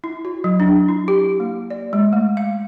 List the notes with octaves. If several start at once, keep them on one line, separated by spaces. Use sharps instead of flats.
E4
F#4
F#3
D4
E4
G4
A#3
D5
G#3
A3
F5